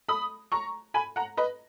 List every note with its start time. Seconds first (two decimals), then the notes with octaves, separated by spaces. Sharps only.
0.09 B5 D#6
0.52 A#5 C#6
0.94 G#5 B5
1.16 F#5 A#5
1.37 B4 D#5